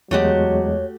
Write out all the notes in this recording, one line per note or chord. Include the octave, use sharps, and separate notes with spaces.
E2 F#3 G#3 A3 F#4 G4 C#5